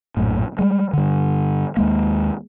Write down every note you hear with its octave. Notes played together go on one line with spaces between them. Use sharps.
A#1 F#2 A2
G3 G#3
G2 D3
D#2 G#3 A#3